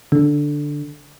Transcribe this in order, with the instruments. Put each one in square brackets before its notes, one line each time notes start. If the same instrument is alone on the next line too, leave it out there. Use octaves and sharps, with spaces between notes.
[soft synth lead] D3